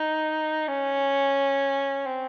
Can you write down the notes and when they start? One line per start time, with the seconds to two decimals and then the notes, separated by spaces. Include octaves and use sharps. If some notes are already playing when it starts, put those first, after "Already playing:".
Already playing: D#4
0.68 C#4
2.06 C4